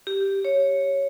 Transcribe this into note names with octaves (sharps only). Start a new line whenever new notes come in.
G4
C#5